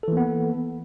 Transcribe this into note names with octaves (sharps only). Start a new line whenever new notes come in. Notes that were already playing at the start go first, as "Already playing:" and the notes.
E3 A#3 B3 A4